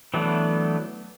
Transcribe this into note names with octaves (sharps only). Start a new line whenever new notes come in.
E3 F#3 A3 B3 D4